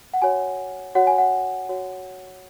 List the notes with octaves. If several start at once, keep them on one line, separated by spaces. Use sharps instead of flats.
F#5
F#4 C#5 G#5
F#4 C#5 F#5
G#5
F#5
F#4 C#5